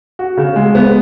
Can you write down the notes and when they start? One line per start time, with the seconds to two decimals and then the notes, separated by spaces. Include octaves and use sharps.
0.19 F#4
0.37 C#3
0.56 G#3
0.75 B3